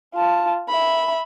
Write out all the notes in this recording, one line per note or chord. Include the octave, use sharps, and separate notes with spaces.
F4 A5
E5 B5